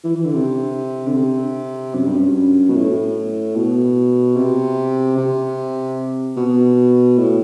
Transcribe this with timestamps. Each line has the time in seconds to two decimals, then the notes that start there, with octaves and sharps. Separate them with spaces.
0.04 E3
0.15 E3
0.24 D3
0.34 C3
1.07 D3
1.15 C3
1.95 F#2
2.06 G2
2.18 F#2
2.69 B2
2.75 A2
3.56 B2
4.36 C3
5.17 C3
6.37 B2
7.17 A2